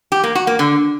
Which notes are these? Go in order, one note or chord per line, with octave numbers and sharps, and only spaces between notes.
G4
A#3
F#4
A#3
D3